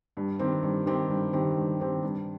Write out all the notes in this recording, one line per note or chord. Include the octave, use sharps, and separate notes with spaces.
G2
D#3 C4 G4
G2
D#3 C4 G4
G2
D#3 C4 G4
G2
D#3 C4 G4
G2